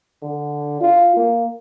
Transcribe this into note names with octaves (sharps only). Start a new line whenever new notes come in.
D3
F4
A#3